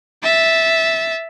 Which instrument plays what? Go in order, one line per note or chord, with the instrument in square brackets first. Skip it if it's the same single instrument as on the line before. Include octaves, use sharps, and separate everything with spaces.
[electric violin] E5 A6